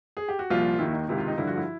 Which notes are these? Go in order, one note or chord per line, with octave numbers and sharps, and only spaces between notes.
G#4
G4
F#4
C2 A#2 F3 F4
D#2 D#3 E4
D#4
C#2 C3 D#3 E4
F4
D#4
G2 D3 F3 E4
F#4
E4